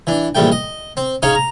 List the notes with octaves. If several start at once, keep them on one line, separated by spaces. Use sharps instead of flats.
E3 D4
A#1 E2 G3 A3 G5
D#5
C4
C#4 D#4 G#4 C#5 F5
A#5